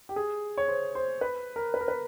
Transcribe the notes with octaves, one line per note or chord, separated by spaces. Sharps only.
G4
G#4
C#5
C5
C5
B4
A#4
B4
A#4
B4